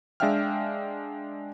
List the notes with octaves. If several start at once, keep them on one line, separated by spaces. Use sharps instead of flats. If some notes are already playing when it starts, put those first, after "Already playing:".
G#3 D4 E5 F5 G5 F6